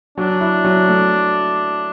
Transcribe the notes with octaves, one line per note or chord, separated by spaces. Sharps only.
F#3 D4
E4
F#3
A3